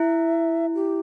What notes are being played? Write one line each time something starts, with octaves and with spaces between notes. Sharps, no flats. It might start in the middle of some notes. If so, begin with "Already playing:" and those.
Already playing: E4 E5
G4